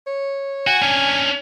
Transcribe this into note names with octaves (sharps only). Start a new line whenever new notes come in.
C#5
F#4 G#5
C#4 D4